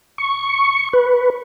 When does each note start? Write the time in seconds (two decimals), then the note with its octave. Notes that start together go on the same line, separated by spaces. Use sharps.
0.18 C#6
0.93 B4